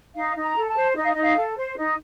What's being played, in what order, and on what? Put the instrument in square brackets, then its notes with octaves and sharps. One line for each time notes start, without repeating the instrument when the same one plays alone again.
[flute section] D#4 F5
D#4
A#5
A4
A5
C5
D#4 D#5
F5
D#5
D#4
F5
A4
C5
D#4